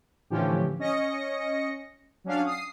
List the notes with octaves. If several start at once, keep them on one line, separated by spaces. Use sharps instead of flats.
A2 D3 E3 F3 C#4 G4
C#4 D#5 A#6 C#7
F#3 C#4 D4 F5
D#6 C7